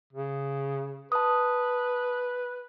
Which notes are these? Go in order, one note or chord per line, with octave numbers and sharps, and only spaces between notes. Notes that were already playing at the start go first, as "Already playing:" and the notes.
C#3
B4 A5 D#6